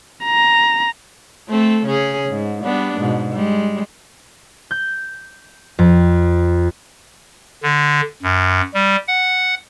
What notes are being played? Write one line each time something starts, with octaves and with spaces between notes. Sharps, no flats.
A#5
A3 C4 A4
C#3 C#4 G#4
G#2
G3 B3 D4
G#2 B2
G3 G#3
G6
F2
D3
F#2
G3
F#5